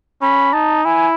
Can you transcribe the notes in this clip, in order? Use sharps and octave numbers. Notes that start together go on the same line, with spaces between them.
C#4 B5
D#4 A5
E4 G#5